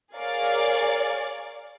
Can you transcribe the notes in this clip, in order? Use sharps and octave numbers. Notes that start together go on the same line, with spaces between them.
G#4 A#4 C#5 D5 F5